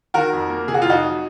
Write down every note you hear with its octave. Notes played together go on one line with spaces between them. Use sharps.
D#3 F#4 A#4
F2
A#3
C3 G#4
F#4
F4
F2 D#4 F#4
F#3